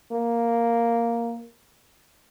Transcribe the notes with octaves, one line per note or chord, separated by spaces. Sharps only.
A#3